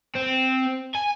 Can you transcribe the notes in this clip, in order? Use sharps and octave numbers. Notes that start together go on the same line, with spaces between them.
C4
G#5